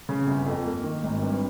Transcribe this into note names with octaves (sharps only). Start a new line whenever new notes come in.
C#3
G1
F2
A#3
D#3
G#1
G2